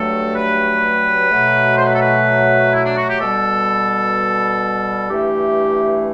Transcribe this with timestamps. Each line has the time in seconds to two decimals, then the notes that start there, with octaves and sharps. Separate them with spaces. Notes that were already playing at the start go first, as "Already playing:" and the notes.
Already playing: G2 F#3 A3 A4
0.35 B4
1.30 B2 F#3 A3
1.77 C5
1.85 B4
1.93 A4
2.01 B4
2.73 E4
2.84 D4
2.96 F#4
3.09 G4
3.20 B2 G3 A4
5.10 G2 E3 A3 G4